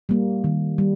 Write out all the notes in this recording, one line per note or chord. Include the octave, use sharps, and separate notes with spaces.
G3 A#3
D#3
G3